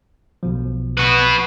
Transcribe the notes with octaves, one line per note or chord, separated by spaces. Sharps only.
B1 B2 F3
F#4 B4